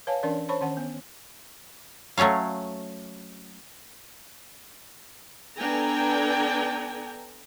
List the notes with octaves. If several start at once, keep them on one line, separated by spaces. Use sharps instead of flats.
B4 C#5 F5 G#5 A5
E3 C#4 D4 A#4 D5
C5 C#5 A5 B5 C#6
D#3 C#4 F#5
B3
F#3 A3 C#4 C#5 F5
B3 D4 A4 G5 G#5 A#5